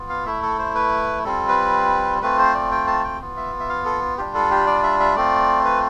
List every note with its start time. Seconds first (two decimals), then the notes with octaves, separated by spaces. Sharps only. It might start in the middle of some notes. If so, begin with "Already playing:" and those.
Already playing: B3 F4
0.09 F5
0.26 A3 E4 E5
0.43 A4
0.59 C5
0.75 B4
1.24 G3 C4 F4 A4
1.48 B4
2.22 A3 C4 F4 B4
2.39 C5
2.55 D5
2.71 G5
2.87 A5
3.04 G5
3.21 B3 F4
3.37 E5
3.60 E5
3.69 F5
3.85 A4
4.18 G3 D4 F4 G4
4.35 A4
4.51 G4
4.67 D5
4.83 E5
5.00 E5
5.16 A3 C4 F4 D5
5.65 B4